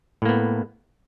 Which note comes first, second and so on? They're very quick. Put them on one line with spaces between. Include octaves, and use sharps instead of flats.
A2 A#3 B3